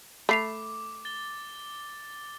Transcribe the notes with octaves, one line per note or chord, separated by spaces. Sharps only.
A3 B5 D6 C7 F7
A6 G7